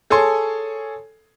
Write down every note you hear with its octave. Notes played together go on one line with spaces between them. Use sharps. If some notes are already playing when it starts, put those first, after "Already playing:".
G#4 A4 C#5 G#5 C6